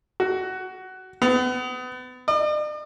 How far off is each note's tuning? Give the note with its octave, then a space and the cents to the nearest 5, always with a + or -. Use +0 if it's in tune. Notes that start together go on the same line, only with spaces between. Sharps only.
F#4 +15
B3 +35
D5 +45